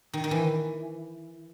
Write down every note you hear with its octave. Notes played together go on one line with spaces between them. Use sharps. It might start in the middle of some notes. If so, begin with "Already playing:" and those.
D#3
D#3
E3